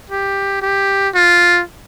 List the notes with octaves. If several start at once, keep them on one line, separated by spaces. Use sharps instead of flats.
G4
G4
F4